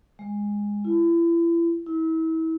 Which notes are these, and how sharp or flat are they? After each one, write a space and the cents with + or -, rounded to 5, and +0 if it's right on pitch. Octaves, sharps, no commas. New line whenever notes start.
G#3 -15
E4 +35
E4 -35